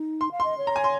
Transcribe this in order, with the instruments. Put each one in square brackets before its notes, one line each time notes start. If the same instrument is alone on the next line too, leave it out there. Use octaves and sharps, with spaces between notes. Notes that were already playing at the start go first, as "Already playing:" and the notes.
Already playing: [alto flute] D#4
[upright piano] C6
[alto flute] F5
[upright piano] C6
[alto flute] D#5
C#5
[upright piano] A#5
G#5
C6